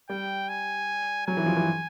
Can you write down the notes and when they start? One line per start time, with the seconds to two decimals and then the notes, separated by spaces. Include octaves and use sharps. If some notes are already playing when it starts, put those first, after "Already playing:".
0.09 G3 G5
0.49 G#5
1.27 F#3 G#5
1.37 E3
1.46 F3
1.56 E3